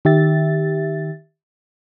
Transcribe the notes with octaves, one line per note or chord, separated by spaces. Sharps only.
D#3 G4 E5 A6